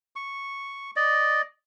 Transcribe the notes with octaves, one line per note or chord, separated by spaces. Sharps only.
C#6
D5 D#5